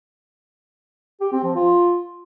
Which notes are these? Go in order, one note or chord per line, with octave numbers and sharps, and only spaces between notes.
G4
C4
F3
F4